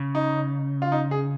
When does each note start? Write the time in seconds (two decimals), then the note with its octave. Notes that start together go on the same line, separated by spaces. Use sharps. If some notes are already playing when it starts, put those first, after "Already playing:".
Already playing: C#3
0.15 D#4
0.82 F4
0.92 D#4
1.11 G#4